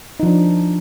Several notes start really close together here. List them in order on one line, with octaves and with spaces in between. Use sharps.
D#4 F3 D4